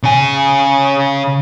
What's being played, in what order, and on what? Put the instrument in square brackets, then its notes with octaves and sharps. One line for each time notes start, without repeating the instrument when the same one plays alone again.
[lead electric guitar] C#3 G#5